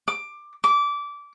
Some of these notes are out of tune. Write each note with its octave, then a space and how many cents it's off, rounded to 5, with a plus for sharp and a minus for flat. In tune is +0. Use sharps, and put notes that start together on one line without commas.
D6 +15
D6 -20